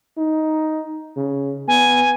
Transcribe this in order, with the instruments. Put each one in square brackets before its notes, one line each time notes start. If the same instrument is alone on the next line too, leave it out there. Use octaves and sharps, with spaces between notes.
[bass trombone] D#4
C#3
[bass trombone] B3 [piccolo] G#5